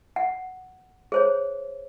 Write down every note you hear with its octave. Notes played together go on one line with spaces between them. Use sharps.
F#5
G#4 C5 C#5